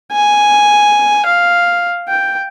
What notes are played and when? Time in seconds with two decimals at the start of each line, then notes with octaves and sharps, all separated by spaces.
0.12 G#5
1.26 F5
2.08 G5